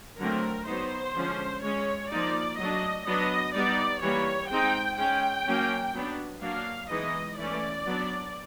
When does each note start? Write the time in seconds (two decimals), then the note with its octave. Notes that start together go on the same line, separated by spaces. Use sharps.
0.19 D3 F#3 A3 C4 A#4
0.67 F#3 B3 D#4 C5
1.15 D3 F3 G#3 C#4
1.63 G#3 C#4 C#5
2.11 F3 A#3 D#4 D5
2.59 F#3 A3 D4 D#5
3.06 F#3 B3 D4 D#5
3.54 G3 B3 D#4 D5
4.02 E3 G3 A#3 C#5
4.50 G#3 C4 D#4 G5
4.98 G#3 C#4 G5
5.46 F#3 A#3 C#4
5.94 F#3 B3 D4
6.42 F#3 A#3 D4 F5
6.90 E3 G#3 B3 D#4 D#5
7.38 E3 A3 C#4 D5
7.86 F#3 B3 D4